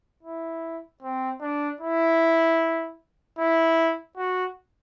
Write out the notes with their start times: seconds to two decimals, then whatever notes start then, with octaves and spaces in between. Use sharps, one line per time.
0.23 E4
1.03 C4
1.41 D4
1.81 E4
3.38 E4
4.17 F#4